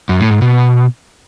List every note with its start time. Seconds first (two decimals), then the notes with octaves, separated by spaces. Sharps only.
0.09 F#2
0.20 A2
0.31 G#2
0.42 B2